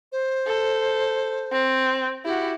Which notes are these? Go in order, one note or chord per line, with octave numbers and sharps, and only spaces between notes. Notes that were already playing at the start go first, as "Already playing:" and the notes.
C5
A4
C4
E4 F#4 G4